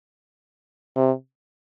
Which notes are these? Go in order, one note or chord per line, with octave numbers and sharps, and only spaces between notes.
C3